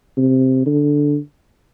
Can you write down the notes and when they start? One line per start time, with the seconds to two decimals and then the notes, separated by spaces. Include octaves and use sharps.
0.18 C3
0.66 D3